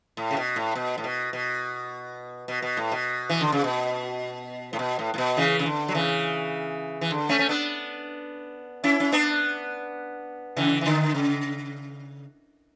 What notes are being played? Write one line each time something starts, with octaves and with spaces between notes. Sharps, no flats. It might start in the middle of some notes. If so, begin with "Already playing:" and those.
A2
C#3
B2
A2
B2
A2
B2
B2
B2
B2
A2
B2
E3
D3
C#3
B2
A2
B2
A2
A2
B2
C#3 E3
C#3
D3
F#3
C#3 E3
E3
D3
A3 C#4
C#4
B3 D4
C#4 E4
C#4
B3 D4
C#3 E3
E3
D3
C#3